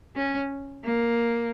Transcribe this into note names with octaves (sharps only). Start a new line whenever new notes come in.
C#4
A#3